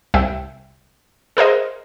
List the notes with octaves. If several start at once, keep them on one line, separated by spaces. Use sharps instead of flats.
C2 E5 G5
G#4 A#4 C5 D#5